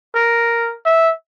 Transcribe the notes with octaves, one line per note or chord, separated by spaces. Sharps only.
A#4
E5